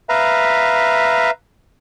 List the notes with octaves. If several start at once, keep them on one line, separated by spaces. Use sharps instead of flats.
B4 E5 F5 A#5